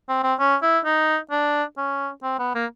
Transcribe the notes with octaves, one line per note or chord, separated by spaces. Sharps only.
C4
C4
C#4
E4
D#4
D4
C#4
C4
B3
A#3